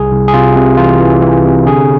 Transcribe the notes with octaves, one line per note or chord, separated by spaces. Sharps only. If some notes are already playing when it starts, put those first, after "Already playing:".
Already playing: C2 G#4
C2
G#4
C3 F4
C3
E3 F4
E3
E3
C3
D3 G#4